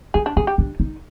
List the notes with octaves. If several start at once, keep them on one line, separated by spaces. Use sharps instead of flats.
D#4 G#4
D4
C#4 G#4
G4
D4
D#4